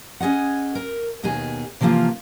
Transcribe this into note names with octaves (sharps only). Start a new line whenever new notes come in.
C#4 G#4 D#5 F#5
A#4
D#2 B2 D#3 G#4 G#5
C3 E3 F3 A#3 F4